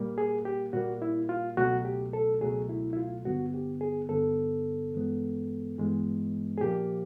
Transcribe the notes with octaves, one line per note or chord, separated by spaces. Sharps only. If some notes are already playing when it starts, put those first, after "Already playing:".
Already playing: A#2 G3 A#3
G#4
G4
A#2 G3 A#3 F#4
E4
F4
C#2 B2 F#3 A3 F#4
G4
A4
C#2 B2 F#3 A3 G#4
E4
E4
F4
G2 D3 G3 B3 F#4
G4
G#4
G2 D3 G3 B3 A4
G2 E3 G#3 B3
G2 E3 G#3 B3
G#4
A#2 F3 A#3 G4